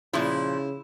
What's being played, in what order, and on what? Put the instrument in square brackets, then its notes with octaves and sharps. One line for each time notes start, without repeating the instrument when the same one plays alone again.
[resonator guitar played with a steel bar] A#2 F3 [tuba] C#3 [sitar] E4